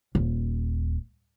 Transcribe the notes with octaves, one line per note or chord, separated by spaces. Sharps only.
D#1